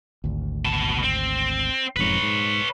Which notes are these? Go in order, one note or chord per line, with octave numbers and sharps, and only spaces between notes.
G#1 D2
B2 A5
C4
E1 F2 G#2 B4 C#5
G#2